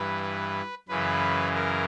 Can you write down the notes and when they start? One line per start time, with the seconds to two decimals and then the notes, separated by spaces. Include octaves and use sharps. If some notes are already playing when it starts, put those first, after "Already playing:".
Already playing: G2 E3 B4
0.88 F#2 C#3 E3 B4
1.55 A#4